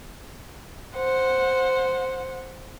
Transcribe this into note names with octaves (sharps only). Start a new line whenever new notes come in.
C5 F#5